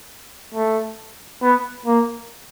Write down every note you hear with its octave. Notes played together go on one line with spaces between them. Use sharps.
A3
B3
A#3